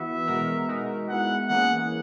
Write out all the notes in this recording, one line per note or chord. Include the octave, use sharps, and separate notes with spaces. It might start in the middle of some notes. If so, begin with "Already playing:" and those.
Already playing: E3 B3 F#4 E5
B2 G#3 B3 F#4 A#4
G#3 D#4 F#4 A#4
G#3 B3 E4 F#5
E3 A#3 C#4 G#4 F#5